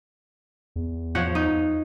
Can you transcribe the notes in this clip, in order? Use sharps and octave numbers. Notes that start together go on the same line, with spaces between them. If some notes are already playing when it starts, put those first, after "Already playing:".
E2
F3 C#5 F#5
D#4